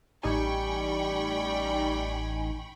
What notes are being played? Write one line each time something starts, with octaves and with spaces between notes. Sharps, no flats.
A1 G3 D#4 G5 G#5 B5 C#6